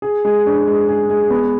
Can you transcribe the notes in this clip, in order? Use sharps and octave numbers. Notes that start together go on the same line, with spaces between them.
G#4
G#3
D4
G#3
G#4
G#3
B3